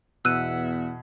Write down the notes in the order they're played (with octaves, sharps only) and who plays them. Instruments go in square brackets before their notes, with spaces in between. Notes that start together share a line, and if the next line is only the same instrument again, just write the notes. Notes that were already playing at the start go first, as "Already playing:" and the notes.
[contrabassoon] E2 [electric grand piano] B2 [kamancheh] E5 F#5 [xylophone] E6 F#6 D#7